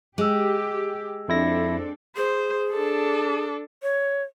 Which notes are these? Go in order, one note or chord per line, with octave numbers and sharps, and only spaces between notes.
G#3 G4 G#4 E6
F2 C4 D4 E4 A4 A#6
G#4 C5
D4 A4
C#5